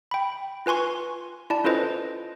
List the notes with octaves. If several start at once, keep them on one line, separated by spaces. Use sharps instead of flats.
G5 B5
F4 B4 G#5 C6 C#6
E4 D5 A5
C#4 F4 A4 B4 C5 D#5